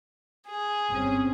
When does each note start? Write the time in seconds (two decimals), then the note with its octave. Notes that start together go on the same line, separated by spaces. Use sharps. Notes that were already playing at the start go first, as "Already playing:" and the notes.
0.47 G#4
0.89 G1 C4 C#4